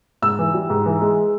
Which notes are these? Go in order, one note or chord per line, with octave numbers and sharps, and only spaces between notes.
G#2 E6
E3
G3
G#2
E3
G#3